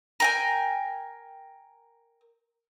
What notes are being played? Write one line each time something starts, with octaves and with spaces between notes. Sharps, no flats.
A#4 G5 G#5